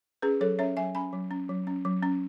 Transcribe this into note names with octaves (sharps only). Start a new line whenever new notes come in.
C#4 G#4 B4
F#3 A4 C#5
C#4 C#5 E5
F#3 E5 G#5
C#4 G#5 B5
F#3
C#4
F#3
C#4
F#3
C#4